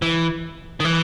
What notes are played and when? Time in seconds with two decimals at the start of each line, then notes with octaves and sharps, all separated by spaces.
0.02 E3
0.80 D#3
0.84 E3